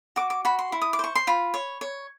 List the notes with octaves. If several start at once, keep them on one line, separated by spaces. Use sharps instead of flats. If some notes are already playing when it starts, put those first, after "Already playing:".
F#4 D6
D6
F#4 B5
C6
E4
D#6
D6
C5 C#6
C6
F4 B5
C#5
C#5